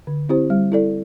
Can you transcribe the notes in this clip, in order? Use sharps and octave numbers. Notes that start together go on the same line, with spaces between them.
D3
C4 E4 G4 C5
G3
E4 A4 D5